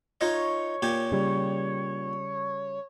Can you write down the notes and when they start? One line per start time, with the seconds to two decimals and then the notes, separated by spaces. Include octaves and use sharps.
0.21 D#4 F4 C#5 D#5
0.82 A#2 G4 G#5
1.12 C#3 G3